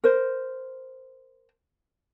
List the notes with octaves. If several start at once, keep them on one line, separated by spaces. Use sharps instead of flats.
A#4 C5